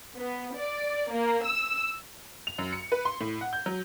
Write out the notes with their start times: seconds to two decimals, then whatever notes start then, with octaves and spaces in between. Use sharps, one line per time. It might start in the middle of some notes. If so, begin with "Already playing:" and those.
0.14 B3
0.54 D5
1.10 A#3
1.43 E6
2.47 F7
2.59 F#2
2.72 C#7
2.92 B4
3.05 C6
3.21 A2
3.41 F#5
3.53 G6
3.66 F#3